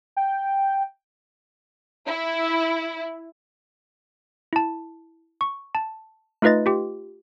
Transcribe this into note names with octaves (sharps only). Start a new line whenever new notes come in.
G5
E4
E4 A5
C#6
A5
A3 D#4 F4 B4 D#5 A6
F4 G4